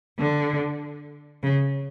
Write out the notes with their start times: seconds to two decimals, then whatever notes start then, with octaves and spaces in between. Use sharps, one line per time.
0.19 D3
1.43 C#3